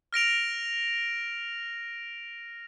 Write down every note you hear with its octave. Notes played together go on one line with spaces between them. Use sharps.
F6 A#6 D7 F7